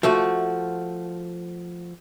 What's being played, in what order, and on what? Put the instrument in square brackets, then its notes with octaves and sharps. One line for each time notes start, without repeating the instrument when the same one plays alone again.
[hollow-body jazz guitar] F3 A3 F#4